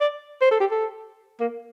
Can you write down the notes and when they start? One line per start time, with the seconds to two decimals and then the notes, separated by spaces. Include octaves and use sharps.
0.01 D5
0.41 C5
0.51 A4
0.60 G4
0.71 A4
1.40 A#3